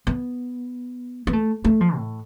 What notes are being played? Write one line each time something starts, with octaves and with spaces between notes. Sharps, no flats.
B3
B3
A3
A3
F3
A2